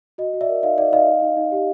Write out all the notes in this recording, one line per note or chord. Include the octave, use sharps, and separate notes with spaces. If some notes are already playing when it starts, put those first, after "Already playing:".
F#4 D#5
F#4
D5 E5
A#4
D#4 D#5 F5
D#4 D5 E5
D#4 D#5 F5
D#4
D#4
D#4
G4